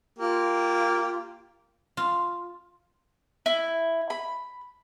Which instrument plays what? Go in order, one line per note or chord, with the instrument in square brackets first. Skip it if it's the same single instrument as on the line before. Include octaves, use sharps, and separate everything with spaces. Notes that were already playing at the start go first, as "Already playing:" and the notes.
[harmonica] A#3 G4 [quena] F4
[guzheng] F4
[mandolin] E4
B5